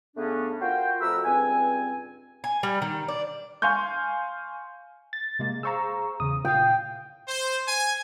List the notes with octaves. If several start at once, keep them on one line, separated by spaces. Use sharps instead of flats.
C#3 A3 B3 C#4 D4
F4 F#4 A#4 C5 G5
F2 A3 F#4 A#4 B4 E6
C#2 G2 C4 G#5
G#5
G3
D#3
D4
F5 G#5 C6 C#6 G6
A6
C3 G#3 A#3
G#4 C5 F5 A#5 C#6 E6
E2 C#3 D#6
A#2 F5 G5
C5
G#5